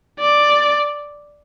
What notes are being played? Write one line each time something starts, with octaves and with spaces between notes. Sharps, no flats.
D5